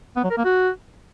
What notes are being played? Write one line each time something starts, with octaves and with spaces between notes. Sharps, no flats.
B3
F#3
A#4
A#3
F#4